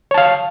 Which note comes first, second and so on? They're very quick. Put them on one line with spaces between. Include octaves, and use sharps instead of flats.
C#5 A5 F5